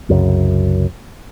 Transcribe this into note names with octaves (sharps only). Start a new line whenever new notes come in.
C2 F#2 C#3